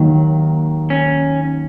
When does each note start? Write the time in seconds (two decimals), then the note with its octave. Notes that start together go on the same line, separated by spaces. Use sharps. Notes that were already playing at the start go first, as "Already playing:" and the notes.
Already playing: D#2 D#3 F#3
0.90 C#4